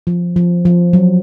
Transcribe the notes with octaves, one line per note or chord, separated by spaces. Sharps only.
F3
F3
F3
F#3